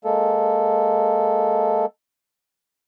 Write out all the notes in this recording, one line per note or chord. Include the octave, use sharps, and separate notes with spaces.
G#3 A#3 A4